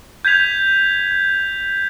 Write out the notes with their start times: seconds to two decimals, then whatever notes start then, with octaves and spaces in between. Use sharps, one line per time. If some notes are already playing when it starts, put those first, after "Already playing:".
0.25 G6 G#6 B6 F7